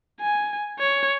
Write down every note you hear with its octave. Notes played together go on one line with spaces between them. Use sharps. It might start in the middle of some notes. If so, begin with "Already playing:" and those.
G#5
C#5